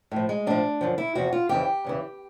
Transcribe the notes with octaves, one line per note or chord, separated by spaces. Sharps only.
A2 F3
G#3
A2 F3 D4
F#2 D3 F3
E4
E2 C3 F3 F#4
F4
F2 C#3 E3 G4
E2 C#3 E3